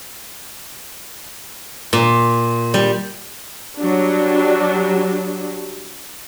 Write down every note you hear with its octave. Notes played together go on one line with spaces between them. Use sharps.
A#2
G3
F#3 G3 D4